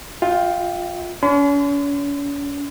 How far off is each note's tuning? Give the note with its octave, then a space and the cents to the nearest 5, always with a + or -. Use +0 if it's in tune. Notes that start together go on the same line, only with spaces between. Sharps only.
F4 +10 E5 -35 G5 -5
C#4 +40 C6 -40